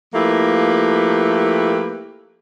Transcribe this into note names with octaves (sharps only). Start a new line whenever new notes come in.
F3 A3 A#3 E4 G4 B4